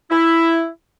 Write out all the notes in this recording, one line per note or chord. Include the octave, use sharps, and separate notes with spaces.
E4